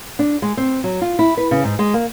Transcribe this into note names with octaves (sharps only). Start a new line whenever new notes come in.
D4
G#3
C4
F#3
F4
E4
B4
C#3
G#2
G#3
A#3